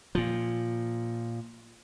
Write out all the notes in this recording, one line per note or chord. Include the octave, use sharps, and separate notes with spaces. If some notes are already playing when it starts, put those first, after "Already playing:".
A#2 F3